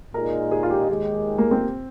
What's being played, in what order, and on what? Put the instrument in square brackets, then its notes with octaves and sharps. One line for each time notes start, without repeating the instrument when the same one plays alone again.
[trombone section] A#2 G#3 D#4 [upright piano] A#4
[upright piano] G#4
F4
G4
[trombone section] D#2 D#3 G#3
[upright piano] A#3
C4